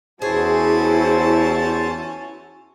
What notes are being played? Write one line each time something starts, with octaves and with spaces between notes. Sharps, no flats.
E2 C#4 E4 F#4 G#4 C5 A5